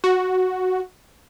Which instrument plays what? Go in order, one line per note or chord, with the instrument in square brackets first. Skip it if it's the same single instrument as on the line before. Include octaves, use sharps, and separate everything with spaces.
[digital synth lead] F#4